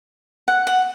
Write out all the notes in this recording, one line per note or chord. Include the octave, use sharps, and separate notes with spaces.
F#5
F#5